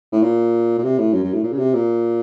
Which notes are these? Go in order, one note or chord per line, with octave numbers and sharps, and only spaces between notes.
A2
A#2
A#2
C3
A2
F#2
F#2
A2
A#2
C#3
C3
A#2